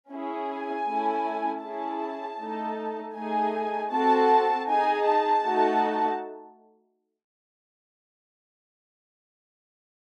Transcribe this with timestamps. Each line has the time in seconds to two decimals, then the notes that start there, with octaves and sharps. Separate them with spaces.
0.10 C#4 E4 G#4
0.49 G#5
0.87 A3 C#4 E4 A4
1.64 C#4 E4 G#4 A5
2.40 A3 D#4 A4
3.15 A3 D#4 G#4 G#5
3.92 C4 F#4 A4 A5
4.69 D#4 G#4 G#5
5.06 A5
5.45 A3 D#4 F#4